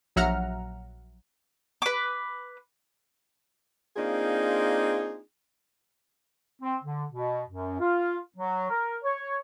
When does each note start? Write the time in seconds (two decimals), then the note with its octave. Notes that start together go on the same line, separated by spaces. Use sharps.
0.16 A#1 F#3 E5 F#5 A#5 F6
1.82 B4 D6
3.96 A#3 C4 D4 D#4 F4 G#4
6.62 C4
6.83 D3
7.12 B2
7.49 F#2
7.80 F4
8.36 F#3
8.70 A#4
9.04 C#5